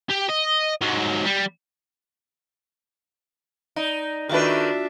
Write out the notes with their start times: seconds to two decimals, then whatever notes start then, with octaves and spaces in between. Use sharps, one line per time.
0.10 G4
0.29 D#5
0.81 G#2 F#3
1.26 G3
3.76 D#4 D5
4.29 D#3 A3 D4 F4 F#4 B4 E5